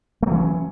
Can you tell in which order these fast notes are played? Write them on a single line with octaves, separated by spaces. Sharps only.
A3 F#3 E3 C#4